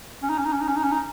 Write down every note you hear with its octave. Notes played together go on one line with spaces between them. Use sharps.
C#4
D#4
C#4
D#4
C#4
D#4
C#4
D#4
C#4
D#4